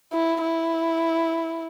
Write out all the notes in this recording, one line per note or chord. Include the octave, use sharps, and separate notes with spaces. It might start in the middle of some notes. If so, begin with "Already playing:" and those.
E4
E4